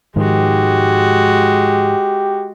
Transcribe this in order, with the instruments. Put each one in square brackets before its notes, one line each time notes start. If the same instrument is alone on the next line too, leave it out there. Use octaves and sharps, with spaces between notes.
[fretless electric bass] G#2 D#3 F3 [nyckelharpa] G#3 F#4 [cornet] G4